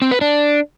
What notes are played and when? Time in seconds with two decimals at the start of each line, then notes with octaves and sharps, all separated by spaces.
0.02 C4
0.11 B4
0.21 D4